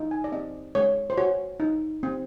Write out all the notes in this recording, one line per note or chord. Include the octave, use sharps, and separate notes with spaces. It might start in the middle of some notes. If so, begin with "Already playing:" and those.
Already playing: D#4
G#5
D5
C4 D#5
G#3 C#5
C5
F#4 C#5
D#4
C4